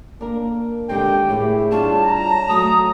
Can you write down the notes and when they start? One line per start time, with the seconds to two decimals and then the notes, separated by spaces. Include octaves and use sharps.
0.21 A#3 D4 A#4
0.89 D3 D#3 G#3 C4 G4 G5
1.29 A2 E4 G#4
1.72 G3 D4 F4 C#5 A5
2.04 A#5
2.49 F#3 A3 D#6